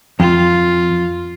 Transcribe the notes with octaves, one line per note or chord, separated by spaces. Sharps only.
F2 F4